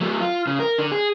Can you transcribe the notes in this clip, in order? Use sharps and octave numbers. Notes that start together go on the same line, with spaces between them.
F#3 A3
F4
C#3
A#4
D3
G#4